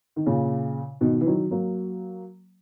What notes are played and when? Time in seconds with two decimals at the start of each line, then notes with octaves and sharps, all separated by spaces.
0.16 D#3
0.26 A#2 C#3
1.01 B2 D#3
1.21 E3
1.26 D#3 F#3
1.51 F#3 A#3